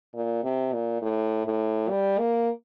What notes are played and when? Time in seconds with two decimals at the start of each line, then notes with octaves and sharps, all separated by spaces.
0.14 A#2
0.44 C3
0.73 A#2
1.02 A2
1.46 A2
1.90 G3
2.18 A#3